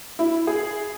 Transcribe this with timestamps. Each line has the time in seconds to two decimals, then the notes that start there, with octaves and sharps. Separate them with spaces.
0.19 E4
0.47 G#4